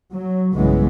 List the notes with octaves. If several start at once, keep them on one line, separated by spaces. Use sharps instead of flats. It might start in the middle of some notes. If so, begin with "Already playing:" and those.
F#3
B1 G2 C#3 E3 G#3 B3